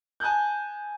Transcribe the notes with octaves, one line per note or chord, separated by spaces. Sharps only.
G#5 A5 D#6 F#6 G6